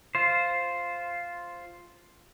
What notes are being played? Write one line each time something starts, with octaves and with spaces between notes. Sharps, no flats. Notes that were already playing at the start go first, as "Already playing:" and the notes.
F4 C5